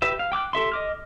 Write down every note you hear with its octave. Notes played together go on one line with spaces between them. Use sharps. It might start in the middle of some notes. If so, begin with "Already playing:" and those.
G4 B4 E5
F5
G5 D6 F6 F#6
G4 A4 E5 C6
D#5 D6 F6